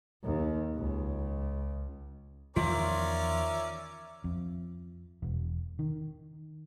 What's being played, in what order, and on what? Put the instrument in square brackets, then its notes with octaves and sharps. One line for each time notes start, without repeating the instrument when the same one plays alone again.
[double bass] D#2
C#2
[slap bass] E2 D#3 F3 [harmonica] C#4 A#4 D5 [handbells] F4 [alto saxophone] E5
[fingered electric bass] F2
E1
D#3